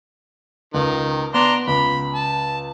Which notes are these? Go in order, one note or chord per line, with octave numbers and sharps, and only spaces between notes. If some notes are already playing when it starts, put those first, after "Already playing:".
C#2 D#3
B3 D4 A#5 C6
C#2 B5
A5